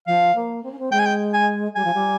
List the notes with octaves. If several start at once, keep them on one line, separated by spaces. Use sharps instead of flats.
F3 F5
A#3
C4
C#4
C4
G#3 G5
G#5
G5
G#5
G3 G#5
F3
G3